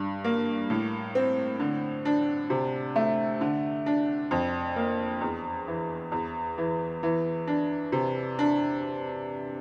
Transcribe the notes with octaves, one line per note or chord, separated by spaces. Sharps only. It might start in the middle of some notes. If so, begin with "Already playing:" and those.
Already playing: G2 G3
A#3
A2
C4
D3
D4
C3
A3
D3
D4
F2
A#3
E2
E3
E2
E3
E3
D4
C3
D4